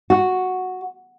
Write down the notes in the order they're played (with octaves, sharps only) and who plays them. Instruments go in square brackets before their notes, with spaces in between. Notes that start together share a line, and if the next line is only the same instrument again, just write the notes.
[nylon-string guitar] F#4